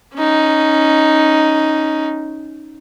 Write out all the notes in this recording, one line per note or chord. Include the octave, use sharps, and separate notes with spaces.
C#4 D#4